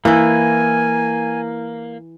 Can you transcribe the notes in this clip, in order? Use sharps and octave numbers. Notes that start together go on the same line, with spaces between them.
E3 A#3 E4 G#5